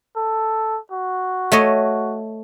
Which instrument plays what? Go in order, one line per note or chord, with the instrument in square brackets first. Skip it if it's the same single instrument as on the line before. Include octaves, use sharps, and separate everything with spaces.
[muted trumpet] A4
F#4
[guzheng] A3 C#5 D#5